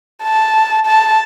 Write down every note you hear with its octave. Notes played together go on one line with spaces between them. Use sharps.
A5
A5